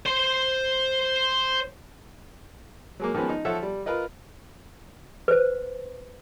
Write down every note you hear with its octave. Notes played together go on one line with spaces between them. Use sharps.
C5 C6
F#3 G#3 A#3
D#3 F3 G#3 B3 C#4
D#4
F3 A4 C#5 E5 F#5
G3
F4 A#4 B4 D#5
B4 C5